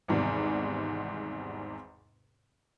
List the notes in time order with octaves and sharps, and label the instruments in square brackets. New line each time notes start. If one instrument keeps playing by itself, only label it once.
[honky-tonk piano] G#1 E2 G#2 C3 G3